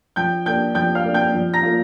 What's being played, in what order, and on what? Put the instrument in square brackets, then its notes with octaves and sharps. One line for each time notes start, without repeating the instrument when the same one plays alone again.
[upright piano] F3 G5 G6
A#3 D4 G5 G6
F3 G5 G6
F5 F6
A#3 D4
G5 G6
F3
A#5 A#6
A#3 F4